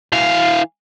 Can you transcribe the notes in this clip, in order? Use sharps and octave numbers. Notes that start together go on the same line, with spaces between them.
E3 F5